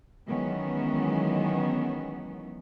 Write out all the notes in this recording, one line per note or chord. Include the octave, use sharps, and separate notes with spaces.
D#3 E3 F#3 G#3 B3 C#4